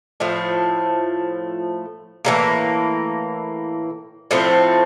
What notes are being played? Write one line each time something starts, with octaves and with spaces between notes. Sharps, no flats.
A2 F3 A3
A2 E3 G3 A#3
A2 F3 A3 C4